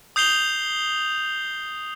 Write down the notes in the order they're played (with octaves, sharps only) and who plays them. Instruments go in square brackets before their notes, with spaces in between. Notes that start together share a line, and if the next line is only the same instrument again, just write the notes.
[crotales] D#6 G6 C7 F7 G7